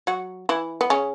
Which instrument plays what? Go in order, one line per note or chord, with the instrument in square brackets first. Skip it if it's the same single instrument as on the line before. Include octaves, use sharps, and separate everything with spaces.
[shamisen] F#3 F#4
E3 E4
B3
C#3 C#4